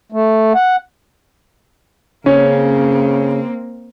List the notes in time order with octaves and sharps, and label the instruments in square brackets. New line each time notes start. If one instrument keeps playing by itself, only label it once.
[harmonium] A3
F#5
[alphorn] C#3 [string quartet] A#3 C4 [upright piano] C#4